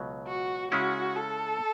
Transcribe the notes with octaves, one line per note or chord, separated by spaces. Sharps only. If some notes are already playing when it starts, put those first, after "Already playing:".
Already playing: C#2 B2 F#3
F#4
C#3 G#3 C#4 E4 F#4
A4